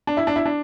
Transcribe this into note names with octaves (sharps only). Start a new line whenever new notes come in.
D4
E4
D4
E4
D4